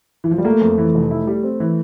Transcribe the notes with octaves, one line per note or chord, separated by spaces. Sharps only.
E3
F3
G3
A3 A#3
F2
E3
F1
E4
G3
C4
E3